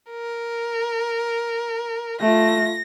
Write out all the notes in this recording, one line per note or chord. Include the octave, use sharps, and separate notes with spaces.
A#4
A3 F4 A#6